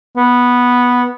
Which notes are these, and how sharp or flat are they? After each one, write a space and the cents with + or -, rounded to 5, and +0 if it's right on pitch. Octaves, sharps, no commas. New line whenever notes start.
B3 -5